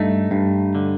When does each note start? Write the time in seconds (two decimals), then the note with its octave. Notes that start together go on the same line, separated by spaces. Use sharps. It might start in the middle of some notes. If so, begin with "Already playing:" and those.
Already playing: G2 A3 D#4
0.31 G2
0.75 D3